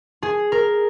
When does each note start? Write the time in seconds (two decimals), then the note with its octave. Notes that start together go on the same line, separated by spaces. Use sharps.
0.23 G#4
0.52 A#4